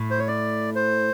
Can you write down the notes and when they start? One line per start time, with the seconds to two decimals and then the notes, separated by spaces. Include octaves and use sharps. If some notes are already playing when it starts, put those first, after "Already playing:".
Already playing: A2
0.11 C5
0.19 C#5
0.28 D5
0.75 C5